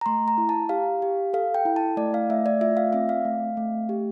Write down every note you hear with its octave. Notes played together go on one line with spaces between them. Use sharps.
A#5
A3 C6
A#5
E4
A5
G4 F5
G4
A4 F5
G5
E4
A5
A3 D5
F5
A3 E5
D5
F4 E5
F5
C4 E5
F5
A3
A3
G4